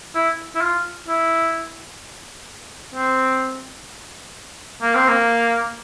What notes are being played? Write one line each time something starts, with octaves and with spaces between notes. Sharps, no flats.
E4
E4
F4
E4
C4
A#3
C4
A#3